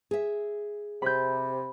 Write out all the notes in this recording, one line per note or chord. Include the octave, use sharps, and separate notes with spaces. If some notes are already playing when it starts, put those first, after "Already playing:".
G#4 E5
C3 B5 G6